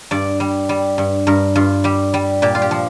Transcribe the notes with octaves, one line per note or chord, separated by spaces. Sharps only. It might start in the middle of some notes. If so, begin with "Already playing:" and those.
G2 D5
G3
G3
G2
G2 A#4
G2 F4
G3 G4
G3
A#2 G4
F4
G4
F3